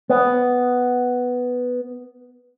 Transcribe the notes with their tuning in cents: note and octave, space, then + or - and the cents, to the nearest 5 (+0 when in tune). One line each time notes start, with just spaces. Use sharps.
B3 +5